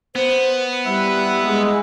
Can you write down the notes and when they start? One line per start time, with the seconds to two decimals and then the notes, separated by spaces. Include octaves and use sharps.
0.15 B3 C5
0.85 G3 E4 E5 F#5
1.43 G#3